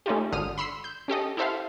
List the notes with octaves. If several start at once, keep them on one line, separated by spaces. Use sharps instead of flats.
A3 C#4 D#4 F4 G4
G#1 D3 D#6 F6 D#7
B5 C6 E6 C7
G6
C#4 G4 A4 D#5
E4 G4 A4 C5 E5 F5